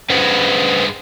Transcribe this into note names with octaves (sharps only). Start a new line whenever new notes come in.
G2 G#3 B4 C5 F#5